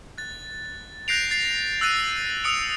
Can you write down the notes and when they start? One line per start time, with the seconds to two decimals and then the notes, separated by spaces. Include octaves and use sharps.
0.18 F#6 A6
1.08 F#6 G6 A#6 C7 D7 F7
1.31 A6 C7
1.81 E6 F#6 A6 D#7
2.44 D#6 E6 C#7 D7 F7